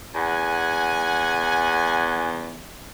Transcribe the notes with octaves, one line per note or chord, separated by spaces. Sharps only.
E2 F#5 G#5